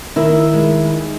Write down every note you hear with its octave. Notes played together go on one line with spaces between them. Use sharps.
D#3 E4
G#3